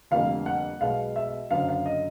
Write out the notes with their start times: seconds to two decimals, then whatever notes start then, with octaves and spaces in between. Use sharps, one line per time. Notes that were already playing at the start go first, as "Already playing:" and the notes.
0.11 F1 F2 D3 G3 A#3 F5
0.46 F#5
0.81 B1 B2 G#3 B3 F5
1.16 E5
1.50 F#1 F#2 D3 F5
1.69 F5
1.86 D#5